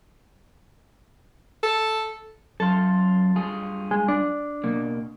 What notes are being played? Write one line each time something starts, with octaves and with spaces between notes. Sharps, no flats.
A4
F#2 F4 A4
G2 F4 G#4
G#3
D4
B2 A#3